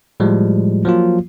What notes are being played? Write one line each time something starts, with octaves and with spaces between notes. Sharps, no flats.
A2 F3 G3 G#3
F3 F#3 A#3 F4